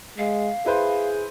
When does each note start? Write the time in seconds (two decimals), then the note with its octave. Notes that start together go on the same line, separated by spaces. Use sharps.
0.18 G#3 F5
0.66 E4 G#4 B4 C5